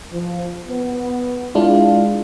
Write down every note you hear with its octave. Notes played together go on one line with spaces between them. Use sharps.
F3
B3
G#3 D4 E4 F4